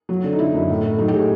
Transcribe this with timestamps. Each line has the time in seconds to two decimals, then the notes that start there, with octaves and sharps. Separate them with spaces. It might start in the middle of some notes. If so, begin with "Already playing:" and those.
0.09 F#3
0.24 D3
0.32 D#4
0.39 D3 E4
0.54 F#2
0.69 A2
0.84 A2
0.98 F#3 D#4
1.08 G4
1.13 A2 G#4